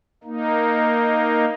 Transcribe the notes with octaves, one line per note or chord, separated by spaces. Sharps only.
A#3 D#4